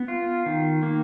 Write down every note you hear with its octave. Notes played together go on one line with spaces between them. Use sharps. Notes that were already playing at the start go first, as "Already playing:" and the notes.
Already playing: B3
F4
D#3
A#3